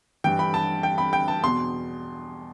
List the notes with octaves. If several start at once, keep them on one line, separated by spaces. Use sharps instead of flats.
G2 E3 G5
B5
A5
G5
B5
G5
A5
E2 B2 C6